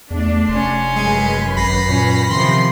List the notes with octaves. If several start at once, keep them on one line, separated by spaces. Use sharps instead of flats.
E2 A3 D4
F1 C#4 C6
F#2 G#3 B4 G#5
G#1 B5 A#6 C7
A#2 C#4
C3 D#3 F3 C6